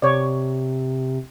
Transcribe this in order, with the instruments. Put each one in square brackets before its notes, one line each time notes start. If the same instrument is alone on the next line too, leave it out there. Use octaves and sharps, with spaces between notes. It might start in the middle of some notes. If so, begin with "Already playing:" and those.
[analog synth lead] C3 [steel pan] C#5 D5